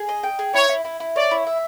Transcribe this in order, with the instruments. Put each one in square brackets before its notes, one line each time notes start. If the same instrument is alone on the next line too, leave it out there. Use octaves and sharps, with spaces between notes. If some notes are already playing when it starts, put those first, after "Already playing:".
Already playing: [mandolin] G#4
D#5
G5
G#4
[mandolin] E4 [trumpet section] C#5
[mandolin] E4
E4
E4
[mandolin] C#5 [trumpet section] D5
[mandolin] E4
E5